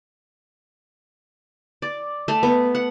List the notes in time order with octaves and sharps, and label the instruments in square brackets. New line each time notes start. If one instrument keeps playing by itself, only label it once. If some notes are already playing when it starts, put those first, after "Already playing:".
[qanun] D5
A3
B3
F#5